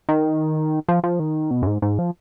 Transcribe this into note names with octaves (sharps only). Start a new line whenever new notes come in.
D#3
F3
F3
D#3
B2
F#2
G#2
G#2
F3